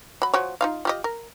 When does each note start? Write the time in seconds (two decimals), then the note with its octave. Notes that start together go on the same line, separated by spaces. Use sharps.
0.22 F#3 B5
0.33 F3 F#4 C#5
0.61 D#4 F4 F5
0.85 F4 G4 D#5
1.04 A#4